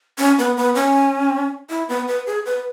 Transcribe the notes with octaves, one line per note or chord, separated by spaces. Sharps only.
C#4
B3
B3
C#4
E4
B3
B4
G#4
B4